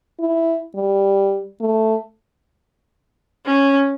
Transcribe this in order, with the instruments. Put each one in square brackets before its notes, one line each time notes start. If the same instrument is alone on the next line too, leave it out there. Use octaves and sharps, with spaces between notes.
[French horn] E4
G3
A3
[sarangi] C#4